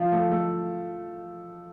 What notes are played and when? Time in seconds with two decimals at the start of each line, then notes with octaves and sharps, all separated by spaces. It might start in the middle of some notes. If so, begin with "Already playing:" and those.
Already playing: F3 F4
0.12 A3 A4
0.30 A3 A4